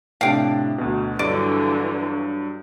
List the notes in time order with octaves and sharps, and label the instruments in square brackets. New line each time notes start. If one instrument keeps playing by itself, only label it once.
[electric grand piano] A2 C3 D4 [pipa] F5 G5
[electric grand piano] D2 B2
[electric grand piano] G2 F#3 [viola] D3 E3 [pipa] D5